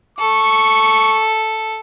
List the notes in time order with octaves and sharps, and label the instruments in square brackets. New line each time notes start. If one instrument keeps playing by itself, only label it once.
[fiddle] A4 [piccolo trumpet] C#6